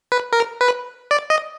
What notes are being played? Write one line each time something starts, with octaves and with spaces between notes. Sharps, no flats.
B4
A#4
B4
D5
D#5